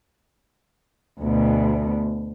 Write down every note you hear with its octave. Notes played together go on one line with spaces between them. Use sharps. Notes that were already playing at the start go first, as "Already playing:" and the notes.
D2 B2